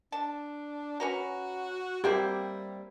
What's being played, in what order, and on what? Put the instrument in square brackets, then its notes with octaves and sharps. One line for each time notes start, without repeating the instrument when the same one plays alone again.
[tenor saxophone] D4 [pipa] A5
[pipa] C#4 B4 A#5 [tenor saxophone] F#4
[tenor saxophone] G3 [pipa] A#3 C4 E4 [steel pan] G4 G5